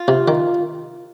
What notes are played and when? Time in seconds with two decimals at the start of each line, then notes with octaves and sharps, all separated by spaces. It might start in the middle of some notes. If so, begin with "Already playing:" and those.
Already playing: F4
0.08 C3
0.28 D#3